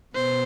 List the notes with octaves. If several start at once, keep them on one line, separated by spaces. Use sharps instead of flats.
B2 B3 C5